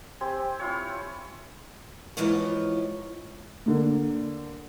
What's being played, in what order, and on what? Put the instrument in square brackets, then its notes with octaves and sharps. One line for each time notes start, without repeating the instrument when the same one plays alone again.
[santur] C4 G4 C5 G#5
E4 F4 C#5
[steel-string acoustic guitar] G#2 E3 F3 F4 C#5
[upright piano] D3 A#3